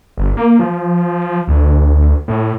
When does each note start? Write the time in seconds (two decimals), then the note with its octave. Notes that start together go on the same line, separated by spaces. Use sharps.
0.17 G1
0.37 A#3
0.59 F3
1.48 D2
2.28 A2